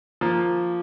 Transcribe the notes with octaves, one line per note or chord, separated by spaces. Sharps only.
F3 A#3